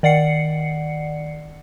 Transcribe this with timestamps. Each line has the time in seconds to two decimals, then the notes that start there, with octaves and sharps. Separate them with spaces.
0.03 D#3 D5 F#5 C7 C#7